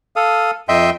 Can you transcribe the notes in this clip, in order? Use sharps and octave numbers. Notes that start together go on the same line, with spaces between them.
A4 F5 D#6
F2 D#5 E5 G5 C6 G6